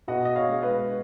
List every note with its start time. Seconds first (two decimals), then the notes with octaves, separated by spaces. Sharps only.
0.08 B2 D#5 F#5
0.25 D#5
0.35 C#5 F5
0.49 G#3
0.62 B4 D#5